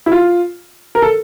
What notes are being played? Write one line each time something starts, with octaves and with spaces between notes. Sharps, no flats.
E4
F4
A#4
A4